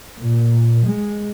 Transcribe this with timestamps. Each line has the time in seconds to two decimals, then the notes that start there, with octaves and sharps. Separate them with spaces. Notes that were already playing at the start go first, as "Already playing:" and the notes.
0.19 A#2
0.85 G#3